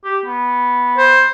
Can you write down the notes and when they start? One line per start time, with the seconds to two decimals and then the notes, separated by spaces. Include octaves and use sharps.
0.05 G4
0.26 B3
0.98 C5